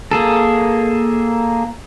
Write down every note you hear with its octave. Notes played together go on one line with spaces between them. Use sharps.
A#3 G#4 A4